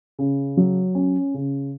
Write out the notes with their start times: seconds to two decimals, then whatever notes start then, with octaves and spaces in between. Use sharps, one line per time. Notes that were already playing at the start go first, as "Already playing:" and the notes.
0.19 C#3
0.57 F#3
0.95 C#4
1.34 C#3